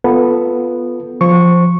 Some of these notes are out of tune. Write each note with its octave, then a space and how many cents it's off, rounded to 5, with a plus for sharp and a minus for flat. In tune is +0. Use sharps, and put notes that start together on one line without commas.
B3 +0 F4 +0 A4 -5
F3 +0 C5 +0 C#6 +0